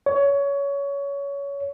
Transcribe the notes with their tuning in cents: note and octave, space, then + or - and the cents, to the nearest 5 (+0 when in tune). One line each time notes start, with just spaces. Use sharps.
C#5 +20